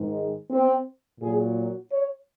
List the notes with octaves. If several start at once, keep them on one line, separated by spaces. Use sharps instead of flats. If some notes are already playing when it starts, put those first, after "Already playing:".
Already playing: G#2 D#3 G#3
C4
A#2 F#3 G#4
C#5